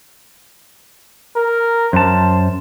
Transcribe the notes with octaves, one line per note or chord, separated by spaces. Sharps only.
A#4
F#2 C5 A5